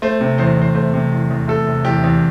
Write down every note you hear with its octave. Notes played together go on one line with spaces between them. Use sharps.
A3 C5
C3
E2 C5
E2 C5
A3 C5
C3
E2
E2
A3 A4
C3
E2 G4
E2